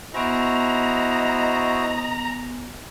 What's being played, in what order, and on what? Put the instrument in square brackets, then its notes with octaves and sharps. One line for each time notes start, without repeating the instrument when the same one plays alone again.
[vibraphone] B3 G#5 [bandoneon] E4 F#4 C5 [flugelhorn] D#5 [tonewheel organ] A#5